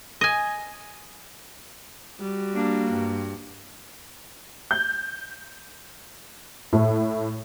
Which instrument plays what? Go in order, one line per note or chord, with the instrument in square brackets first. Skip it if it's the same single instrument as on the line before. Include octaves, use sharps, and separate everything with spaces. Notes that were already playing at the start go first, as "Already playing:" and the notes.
[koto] D#5 G#5
[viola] G3 F#4
[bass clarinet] A#3 [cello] D4
[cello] G2
[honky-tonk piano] G6
A2 A3